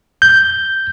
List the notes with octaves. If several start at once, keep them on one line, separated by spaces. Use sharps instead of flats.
G6